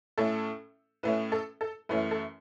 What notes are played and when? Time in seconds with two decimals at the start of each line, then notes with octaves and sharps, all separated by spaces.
0.18 A2 A3 C#4 A4
1.03 A2 A3 C#4 B4
1.32 A4
1.61 A4
1.89 F#2 E3 A3 C#4 B4
2.11 A4